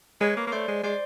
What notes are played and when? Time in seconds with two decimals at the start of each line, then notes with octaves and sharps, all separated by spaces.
0.20 G#3 B4 C#5
0.37 A#3
0.47 A#3
0.52 A3 C5 D5
0.68 G#3
0.83 G#3 C5 D5